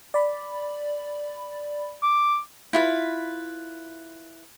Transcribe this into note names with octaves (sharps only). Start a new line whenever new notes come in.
D5 B5
D6
E4 F4 B4